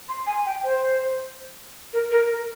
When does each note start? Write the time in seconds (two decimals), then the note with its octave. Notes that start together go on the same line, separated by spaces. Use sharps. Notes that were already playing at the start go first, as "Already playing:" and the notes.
0.08 C6
0.27 G#5
0.46 G5
0.64 C5
1.93 A#4
2.11 A#4
2.29 A#4